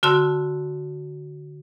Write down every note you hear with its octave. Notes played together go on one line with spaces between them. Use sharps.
D3 F#4 A5 C6 E6